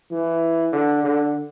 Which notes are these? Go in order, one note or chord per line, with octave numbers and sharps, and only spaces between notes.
E3
D3
D3